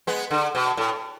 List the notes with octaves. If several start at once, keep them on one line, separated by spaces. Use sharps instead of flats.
G#3 B3
D3
B2
A2